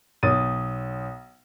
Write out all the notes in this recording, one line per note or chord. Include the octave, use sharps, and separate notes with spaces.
B1 D#6 A6 D#7